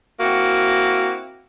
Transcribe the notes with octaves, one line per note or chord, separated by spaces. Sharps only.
A#3 C4 E4 F#4